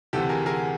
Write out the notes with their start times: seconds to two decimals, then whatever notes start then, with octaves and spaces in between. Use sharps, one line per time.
0.13 D2 C3 E3 G4 A4
0.29 G#4 A#4
0.46 G#4 A#4